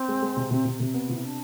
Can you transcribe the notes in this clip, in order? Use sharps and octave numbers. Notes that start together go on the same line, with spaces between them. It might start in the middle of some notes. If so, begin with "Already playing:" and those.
Already playing: C4
G#3
G#3
C3
C3
C3
C3
B3
C3 F4
E4
D4